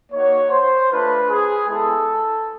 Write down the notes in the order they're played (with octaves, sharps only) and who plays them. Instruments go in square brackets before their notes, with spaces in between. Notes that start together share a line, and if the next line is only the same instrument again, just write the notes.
[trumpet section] A#3 D#4 F#4 C#5
C5
A3 D4 F4 B4
G#4
G#3 B3 E4 A4